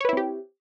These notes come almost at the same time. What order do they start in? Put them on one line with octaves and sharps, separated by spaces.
C#5 B4 E4 C4 G4